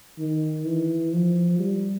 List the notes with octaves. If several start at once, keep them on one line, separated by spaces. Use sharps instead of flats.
D#3
E3
F3
G3